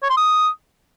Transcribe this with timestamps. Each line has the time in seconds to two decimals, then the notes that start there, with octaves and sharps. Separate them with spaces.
0.03 C#5
0.10 C6
0.17 D#6